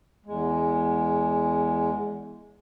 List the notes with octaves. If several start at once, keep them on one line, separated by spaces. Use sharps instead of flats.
E2 G#3